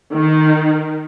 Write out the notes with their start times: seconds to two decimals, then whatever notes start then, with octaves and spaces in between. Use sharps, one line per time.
0.13 D#3